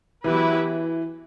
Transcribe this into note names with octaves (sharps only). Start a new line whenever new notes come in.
E3 F#3 B3 E4 G4 B4